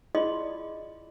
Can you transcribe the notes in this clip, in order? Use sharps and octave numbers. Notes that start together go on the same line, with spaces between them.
E4 F4 G#4 D5 D#5 C6